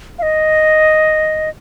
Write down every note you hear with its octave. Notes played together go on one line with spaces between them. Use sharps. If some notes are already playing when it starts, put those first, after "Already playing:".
F5
D#5